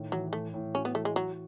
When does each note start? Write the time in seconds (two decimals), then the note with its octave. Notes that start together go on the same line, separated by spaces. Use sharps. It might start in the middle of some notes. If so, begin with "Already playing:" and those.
Already playing: A2 D#3
0.12 E3 F#3
0.33 A2 A3
0.54 A2
0.75 C#4 F#4
0.85 B3
0.95 E3 A3
1.05 G#3
1.16 F#3 F#4